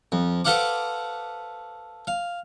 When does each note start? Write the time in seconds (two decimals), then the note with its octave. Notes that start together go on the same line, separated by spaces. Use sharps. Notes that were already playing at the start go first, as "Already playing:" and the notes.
0.12 F2
0.45 A4 B4 C5 F5 F#5 D6
2.07 F5